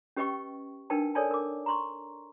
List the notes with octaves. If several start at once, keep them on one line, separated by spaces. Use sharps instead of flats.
C#4 G4 B4 D#5 G5 C#6
D4 D#4 A#4 B4 G5 A5
A4 A#4 C#5 D5 G#5 A5
A#4 D6
A#5 C6 C#6